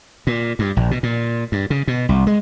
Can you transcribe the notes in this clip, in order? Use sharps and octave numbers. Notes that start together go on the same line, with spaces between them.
A#2
G2
A#1
B2
A#2
G2
C#3
B2
C2
G#3